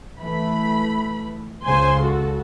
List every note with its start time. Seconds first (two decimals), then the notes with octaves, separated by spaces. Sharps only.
0.21 E3 A3 B5
1.65 C#2 C#3 C5 G#5 C6
2.01 F#4 A4